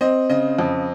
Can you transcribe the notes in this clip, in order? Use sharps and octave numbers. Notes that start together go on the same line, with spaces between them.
C4 D#5
C#3 D#5
F2